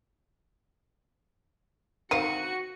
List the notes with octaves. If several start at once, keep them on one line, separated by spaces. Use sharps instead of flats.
D#3 C4 F#4 F5 C#7 D#7